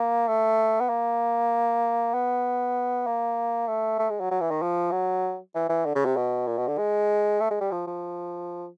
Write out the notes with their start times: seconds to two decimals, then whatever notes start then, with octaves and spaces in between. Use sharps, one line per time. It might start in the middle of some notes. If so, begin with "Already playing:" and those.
Already playing: A#3
0.28 A3
0.81 B3
0.89 A#3
2.14 B3
3.07 A#3
3.68 A3
3.99 A3
4.10 G#3
4.20 F#3
4.31 F#3
4.41 E3
4.51 D#3
4.62 F3
4.92 F#3
5.55 E3
5.69 E3
5.86 D3
5.96 C#3
6.06 C3
6.17 B2
6.47 A#2
6.58 B2
6.68 D3
6.78 G#3
7.41 A3
7.51 G#3
7.61 G3
7.72 F3
7.87 F3